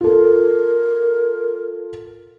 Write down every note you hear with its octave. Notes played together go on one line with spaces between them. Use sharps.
F4 A4 A#4